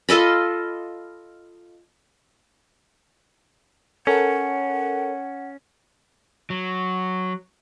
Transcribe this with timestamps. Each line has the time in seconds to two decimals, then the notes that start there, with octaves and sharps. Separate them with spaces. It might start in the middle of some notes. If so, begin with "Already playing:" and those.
0.09 F4 A4 D#5 B5
4.07 C#4 A4 A#4 C#5 F#5
6.50 F#3